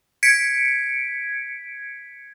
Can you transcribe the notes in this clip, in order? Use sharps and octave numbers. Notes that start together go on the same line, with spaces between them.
G#6 B6 C#7 D7